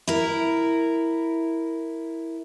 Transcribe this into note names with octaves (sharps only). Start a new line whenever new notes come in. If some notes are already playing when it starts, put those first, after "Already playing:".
E4 A#4